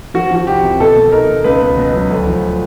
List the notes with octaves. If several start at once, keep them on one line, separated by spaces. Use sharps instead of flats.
F3 F#4
F3
F#4
C2 G4
C3
B2 A4
B2
D#4 A#4
B2
C#2 B4
B3
B2
F#3
D2
F3